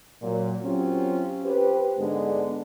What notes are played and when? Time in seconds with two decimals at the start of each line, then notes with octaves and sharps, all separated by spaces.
0.22 A#2 F#3
0.65 F#3 C4 C#4 F4 G4
1.45 G4 B4 C5
1.98 G#2 D3 G#3 B3 D4